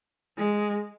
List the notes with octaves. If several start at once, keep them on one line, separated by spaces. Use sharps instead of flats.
G#3